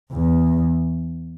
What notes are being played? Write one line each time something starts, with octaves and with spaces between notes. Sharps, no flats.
E2